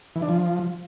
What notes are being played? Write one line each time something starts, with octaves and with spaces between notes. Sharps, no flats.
E3
D4
F3